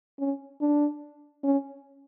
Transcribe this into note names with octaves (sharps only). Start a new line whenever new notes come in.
C#4
D4
C#4